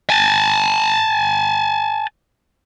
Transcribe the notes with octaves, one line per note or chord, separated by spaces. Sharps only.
G#5 A5